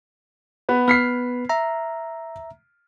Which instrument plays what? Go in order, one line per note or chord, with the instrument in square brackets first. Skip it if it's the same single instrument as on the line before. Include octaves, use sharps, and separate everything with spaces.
[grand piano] B3 B4
[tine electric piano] B3 B4 [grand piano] F6 B6 C7
[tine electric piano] E5 A#5